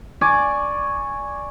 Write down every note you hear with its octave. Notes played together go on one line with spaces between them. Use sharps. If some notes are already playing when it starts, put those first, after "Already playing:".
D5 G#5 C#6 D6